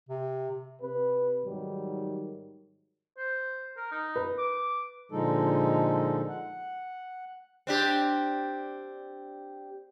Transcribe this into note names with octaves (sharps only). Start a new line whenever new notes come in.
C3
C3 B4
G#2 D#3 F#3 G3
C5
A#4
D#4
B4
D6
A#2 D3 F3 G#3 D#4 A4
F#5
C4 D4 G4